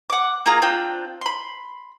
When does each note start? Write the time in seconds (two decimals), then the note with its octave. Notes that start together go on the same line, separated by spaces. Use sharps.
0.10 F#5 D6
0.46 A#3 F4 G#4 A#5
0.62 C4 D4 F4 G5
1.21 B5 C6